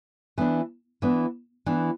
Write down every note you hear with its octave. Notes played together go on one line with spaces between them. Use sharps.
E3 B3 D4
E3 B3 D4
E3 B3 D4